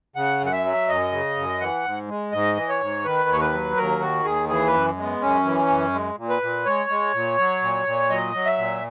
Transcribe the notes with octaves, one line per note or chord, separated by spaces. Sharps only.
C#3 F#5
F#2
F#5
E5
F#3
F#2 D#5
C#3
F#2
E3 F#5
G#2
G#3
G#2 D#5
E3
C#5
G#2
D#3 B4
D#2 C#5
B4
F#3
D#2 A#4
D#3 F#4
D#2 G#4
E3 G#4
B4
F#2
G#3
B3
F#2 C#4
E3
F#2
G#3
A#2
B4
A#2
G#3 C#5
G#3
A#2
F#3
A#2
A#2
F#3 D#5
F#3
E5
A#2